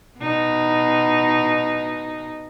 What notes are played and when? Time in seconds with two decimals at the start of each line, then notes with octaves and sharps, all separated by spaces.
0.19 B2 D#4